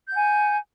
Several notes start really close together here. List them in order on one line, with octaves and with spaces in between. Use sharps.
G6 F#5 G#5